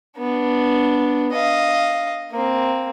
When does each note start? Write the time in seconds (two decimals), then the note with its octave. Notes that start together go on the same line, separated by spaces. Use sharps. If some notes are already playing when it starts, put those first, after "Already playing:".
0.18 B3 D4
1.32 D#5 F5
2.31 A#3 C4